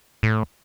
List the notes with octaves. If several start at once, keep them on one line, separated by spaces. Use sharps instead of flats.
A2